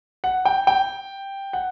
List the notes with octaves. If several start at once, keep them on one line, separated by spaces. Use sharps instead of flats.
F#5
G5
G5
F#5